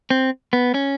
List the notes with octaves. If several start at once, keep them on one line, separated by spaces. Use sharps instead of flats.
C4
B3
C#4